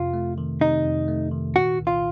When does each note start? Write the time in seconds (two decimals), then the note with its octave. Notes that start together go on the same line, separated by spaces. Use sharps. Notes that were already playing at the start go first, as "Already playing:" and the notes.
Already playing: F2 C3 F4
0.14 A3
0.38 D#3
0.61 C3 D#4
0.85 F2
1.08 A3
1.32 D#3
1.56 A#2 F#4
1.79 C2
1.87 F4